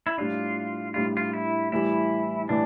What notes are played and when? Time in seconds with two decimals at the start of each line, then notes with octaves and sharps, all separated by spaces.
0.07 E4
0.18 A2 G3 D4 F4
0.94 A2 G3 D4 F4
1.17 F4
1.33 E4
1.72 A2 E3 G3 E4
2.49 A2 E3 D4